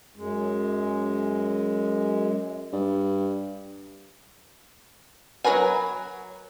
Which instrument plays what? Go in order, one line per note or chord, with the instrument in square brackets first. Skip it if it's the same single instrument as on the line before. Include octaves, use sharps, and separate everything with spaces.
[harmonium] F#2 G#3
[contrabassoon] G2
[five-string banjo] F#3 F#4 A#4 B4 G#5